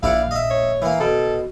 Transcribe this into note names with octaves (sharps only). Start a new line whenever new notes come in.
A#1 E4 D5 F5 F#5
D#5 E5
C#5
E3 A#3
B2 A4